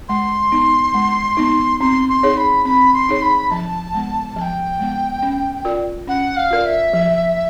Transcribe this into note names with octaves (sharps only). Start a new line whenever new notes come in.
G#3 C6
B3 D#4
G#3
B3 D#4
C4 C6
C6
D#4 G#4 C#5
B5
C4 B5
C6
D#4 G#4 C#5
B5
F3 A5
G#3 B3
F3 A5
G5
G#3 B3
C#4
F4 A#4 D5
C#4 F#5
F5
F4 A#4 D5
E5
F3